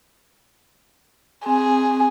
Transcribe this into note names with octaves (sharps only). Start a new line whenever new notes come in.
C4 G#4 G#5